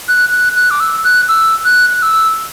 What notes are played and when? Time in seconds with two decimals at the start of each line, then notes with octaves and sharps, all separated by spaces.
0.08 F#6
0.32 F#6
0.56 F#6
0.71 D6
0.80 E6
1.04 F#6
1.29 E6
1.65 F#6
1.90 F#6
2.02 E6